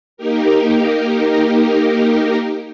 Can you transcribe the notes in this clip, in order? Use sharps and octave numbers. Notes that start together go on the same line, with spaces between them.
A#3 D#4 G4 A#4